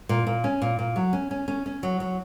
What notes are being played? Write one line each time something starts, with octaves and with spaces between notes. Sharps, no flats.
A#2
A#2
C#4
A#2
A#2
F#3
C#4
C#4
C#4
C#4
F#3
F#3